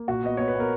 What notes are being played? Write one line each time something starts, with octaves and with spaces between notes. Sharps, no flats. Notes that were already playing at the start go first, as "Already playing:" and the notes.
Already playing: A#3
A#2 F#4
B3 D#5
B3 C#5
B4
B3 A#4